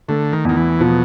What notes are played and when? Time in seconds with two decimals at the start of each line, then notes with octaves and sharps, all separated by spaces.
0.08 D3 A3
0.32 D#3
0.45 E2 D#3
0.57 E3
0.80 B2 F3